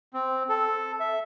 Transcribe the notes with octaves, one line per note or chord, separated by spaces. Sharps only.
C4
A4
E5